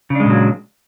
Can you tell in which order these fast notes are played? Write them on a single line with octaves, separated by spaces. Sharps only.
C#3 D4 G#3 A#2 F#3